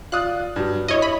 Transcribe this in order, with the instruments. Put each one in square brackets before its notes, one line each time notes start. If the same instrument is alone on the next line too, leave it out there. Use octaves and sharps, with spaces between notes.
[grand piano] F4 D5 D#6 [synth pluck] F#6
[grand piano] G2 F#3
[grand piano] E4 [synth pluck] C#5 D#5
[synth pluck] B5